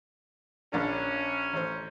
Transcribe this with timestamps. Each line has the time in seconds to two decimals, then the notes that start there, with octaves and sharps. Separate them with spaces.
0.72 A#1 C#4 D4 A#4
1.53 A1 C5